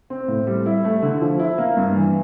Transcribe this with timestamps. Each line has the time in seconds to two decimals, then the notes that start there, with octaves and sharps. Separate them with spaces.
0.10 C4
0.28 A2
0.47 G3
0.66 E4
0.84 A3
1.02 D3
1.21 F3
1.39 E4
1.58 A#3
1.77 G2
1.95 E3